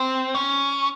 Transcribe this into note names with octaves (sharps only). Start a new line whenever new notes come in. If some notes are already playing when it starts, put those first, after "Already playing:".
Already playing: C4
C#4